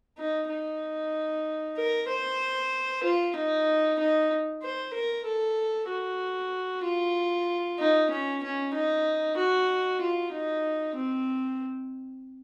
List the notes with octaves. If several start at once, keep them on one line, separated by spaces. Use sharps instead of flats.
D#4
D#4
A#4
C5
F4
D#4
D#4
C5
A#4
A4
F#4
F4
D#4
C#4
C#4
D#4
F#4
F4
D#4
C4